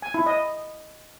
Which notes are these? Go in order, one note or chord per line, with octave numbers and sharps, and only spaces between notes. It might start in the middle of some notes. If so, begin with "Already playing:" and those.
G#5
E4
D#5